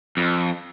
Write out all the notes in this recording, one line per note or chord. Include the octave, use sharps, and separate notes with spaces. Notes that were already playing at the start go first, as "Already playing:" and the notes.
F2